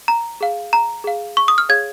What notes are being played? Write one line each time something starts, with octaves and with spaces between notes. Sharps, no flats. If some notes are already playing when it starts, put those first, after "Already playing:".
A#5
G#4 F5
A#5
G#4 F5
C#6
D#6
F6
G#4 C#5 F5 G#6